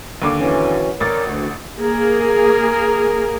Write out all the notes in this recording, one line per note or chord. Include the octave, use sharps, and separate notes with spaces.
D#2 D3 D6
E3 F#3 C#4
A1 A#4 C#5 D5 A6
D2 F#4
A#3 G#4 A#4